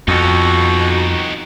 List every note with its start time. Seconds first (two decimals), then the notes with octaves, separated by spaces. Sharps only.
0.08 F2 B2 D#4 F#4